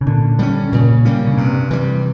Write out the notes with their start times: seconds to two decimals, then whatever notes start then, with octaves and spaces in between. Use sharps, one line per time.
0.01 C#3
0.07 A#2 D3
0.39 G3 A#3 C#4
0.72 A#2 C#3
1.05 G3 A#3 C#4
1.27 C#3
1.38 G2 C3
1.71 E3 G3